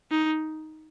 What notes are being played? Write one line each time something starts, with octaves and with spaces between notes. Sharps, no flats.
D#4